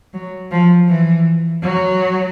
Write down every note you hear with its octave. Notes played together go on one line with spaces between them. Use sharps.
F#3
F3
E3
F#3